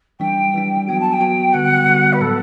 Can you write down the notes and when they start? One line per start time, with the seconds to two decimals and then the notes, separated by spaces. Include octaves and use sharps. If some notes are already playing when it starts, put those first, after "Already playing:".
0.20 E3 G3 D4 G5
0.54 E3 G3 D4
0.88 F#3 B3 F#4 G5
1.00 A5
1.13 G5
1.20 F#3 B3 F#4
1.53 D3 G3 B3 F#4 F#5
1.86 D3 G3 B3 F#4
2.13 B4
2.20 A2 F#3 B3 A4